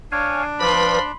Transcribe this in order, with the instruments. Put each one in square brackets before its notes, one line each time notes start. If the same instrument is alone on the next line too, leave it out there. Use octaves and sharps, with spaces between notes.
[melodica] D4 [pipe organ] C#5 F5 G#5
[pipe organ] F3 D5 [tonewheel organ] B4 [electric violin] B5 C6